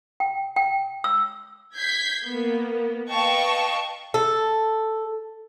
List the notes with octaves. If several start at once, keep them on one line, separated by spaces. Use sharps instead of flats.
G5
G5
E6
G6 G#6 B6 C7
A#3 B3
B4 D#5 F5 G5 A5 C#6
A4